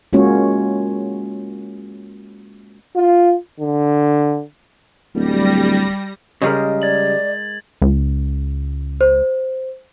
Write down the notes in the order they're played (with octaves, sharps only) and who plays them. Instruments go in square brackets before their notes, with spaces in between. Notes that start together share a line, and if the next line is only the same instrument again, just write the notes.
[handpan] G#3 A#3 C#4 F4 F#4 C#5
[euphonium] F4
D3
[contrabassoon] D1 [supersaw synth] G3 A#6
[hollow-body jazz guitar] C#3 G3 [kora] G#3 G#4 A#4
[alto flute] D5 [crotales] G#6 A6 F#7
[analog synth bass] C#2
[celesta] C5